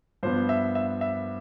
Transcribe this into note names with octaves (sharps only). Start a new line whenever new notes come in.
G2 F3 B3 C5
E5
E5
E5